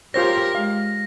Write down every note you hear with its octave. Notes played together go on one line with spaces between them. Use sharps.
F4 G4 A#4 C5 C#5 A#6
G#3 F5